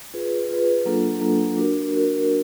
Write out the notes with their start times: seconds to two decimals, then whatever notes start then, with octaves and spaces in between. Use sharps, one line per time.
0.14 F4 G#4 B4
0.49 F4 G#4 B4
0.85 F#3 A#3 D4 F4 A4
1.21 F#3 A#3 D4 F4 A4
1.57 D4 F#4 A#4
1.93 D4 F#4 A#4